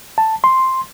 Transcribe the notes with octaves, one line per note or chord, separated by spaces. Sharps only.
A5
C6